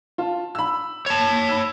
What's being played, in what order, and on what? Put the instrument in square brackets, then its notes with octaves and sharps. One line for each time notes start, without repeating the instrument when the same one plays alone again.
[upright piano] F4 A5
B5 E6
[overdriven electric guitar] C#5 A5
[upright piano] B5 E6 E7